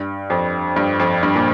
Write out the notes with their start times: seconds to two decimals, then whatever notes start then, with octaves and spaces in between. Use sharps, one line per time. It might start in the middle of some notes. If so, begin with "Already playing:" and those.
Already playing: G2
0.30 F2
0.76 G2
1.00 F2
1.23 G2
1.35 A#2